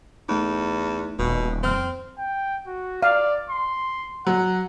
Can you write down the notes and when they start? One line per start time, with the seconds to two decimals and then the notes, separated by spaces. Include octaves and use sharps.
0.29 E2 A3 D#4
1.19 D#1 B2
1.63 F2 C4 F6
2.18 G5
2.67 F#4
3.02 D5 F5
3.50 C6
4.27 F#3 F#5